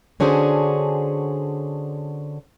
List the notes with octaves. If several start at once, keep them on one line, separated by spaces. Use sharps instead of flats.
D3 C#4 D4 F#4 G#4 C5